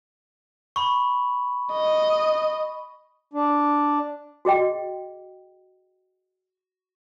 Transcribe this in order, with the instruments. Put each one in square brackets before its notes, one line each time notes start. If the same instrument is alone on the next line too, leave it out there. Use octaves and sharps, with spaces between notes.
[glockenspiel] B5 C#6
[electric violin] D#5
[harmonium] D4
[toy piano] F#4 G#4 D#5 G5